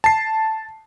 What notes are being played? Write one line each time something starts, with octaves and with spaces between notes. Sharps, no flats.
A5 C7